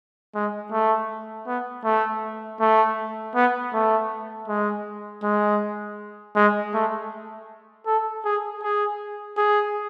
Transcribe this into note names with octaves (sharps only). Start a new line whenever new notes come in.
G#3
A3
B3
A3
A3
B3
A3
G#3
G#3
G#3
A3
A4
G#4
G#4
G#4